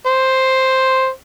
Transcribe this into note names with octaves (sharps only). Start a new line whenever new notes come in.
C5